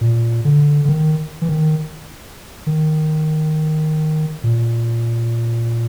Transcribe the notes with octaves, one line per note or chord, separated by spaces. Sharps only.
A#2
D3
D3
D#3
E3
D#3
D#3
A#2